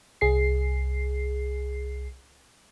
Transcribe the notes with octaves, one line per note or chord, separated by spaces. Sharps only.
C2 G#4 C7